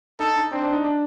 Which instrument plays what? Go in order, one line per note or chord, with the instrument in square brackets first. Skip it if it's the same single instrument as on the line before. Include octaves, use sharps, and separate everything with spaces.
[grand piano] D#4 [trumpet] A4
[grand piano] D#4
[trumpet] C4 [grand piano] D4
[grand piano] D4
D#4
D4